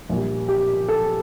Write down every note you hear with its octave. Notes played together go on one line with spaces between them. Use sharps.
A#1 A#2 G3
G4
A4